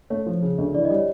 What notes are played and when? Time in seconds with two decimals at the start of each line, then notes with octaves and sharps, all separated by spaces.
0.10 A3 C#5
0.26 F3
0.42 C#3
0.58 D2
0.74 E3 D5
0.85 D#5
0.90 G3 C#5